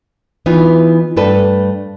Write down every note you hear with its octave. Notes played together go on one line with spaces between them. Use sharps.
E3 B3 D#4 F4
G2 A3 A4 B4 A5